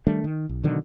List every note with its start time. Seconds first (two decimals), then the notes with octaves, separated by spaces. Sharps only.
0.07 D#3 G3 A3 D4
0.24 D#3
0.49 B1
0.63 B2 D3 D#3 F#3